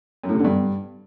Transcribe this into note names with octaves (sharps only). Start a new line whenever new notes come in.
F#2
A2
C3
D3
G2